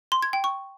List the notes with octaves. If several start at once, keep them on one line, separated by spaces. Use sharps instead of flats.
C6
G#6
G5
C#6